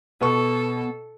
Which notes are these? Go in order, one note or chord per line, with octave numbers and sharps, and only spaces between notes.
B2 B3 A4 C#6